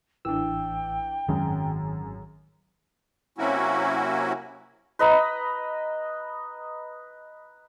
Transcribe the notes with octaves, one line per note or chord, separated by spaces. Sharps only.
A1 E3 D4 G5 E6
G#1 F#2 D#3 G#3 C#4 G#4
C3 F#3 A#3 C#4 E4 F#4
B4 D#5 A#5 B5